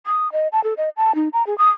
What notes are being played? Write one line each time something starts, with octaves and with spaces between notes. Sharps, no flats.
D#6
D#5
A5
A4
D#5
A5
D#4
A#5
G#4
D#6